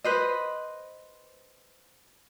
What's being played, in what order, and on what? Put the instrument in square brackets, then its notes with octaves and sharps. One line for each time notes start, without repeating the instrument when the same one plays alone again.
[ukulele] B4 C5 D#5